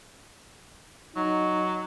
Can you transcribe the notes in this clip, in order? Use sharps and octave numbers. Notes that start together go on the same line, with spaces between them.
F#3 D#4